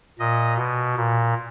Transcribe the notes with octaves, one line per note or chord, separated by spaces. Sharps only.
A#2 D#5
B2
A#2